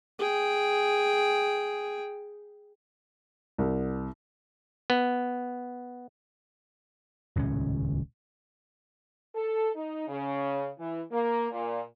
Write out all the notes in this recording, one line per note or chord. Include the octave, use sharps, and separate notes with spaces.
G#4 G5
C2
B3
D#1 C#2 A2 C#4
A4
D#4
C#3
E3
A#3
A#2